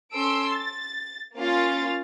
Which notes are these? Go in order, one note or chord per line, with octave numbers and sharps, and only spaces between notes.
C#4 A4 C6 E6 D7
A6
A#3 C#4 F4 F5 A6